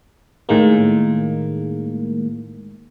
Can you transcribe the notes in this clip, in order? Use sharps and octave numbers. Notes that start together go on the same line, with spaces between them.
A2 D#3 G#3 A#3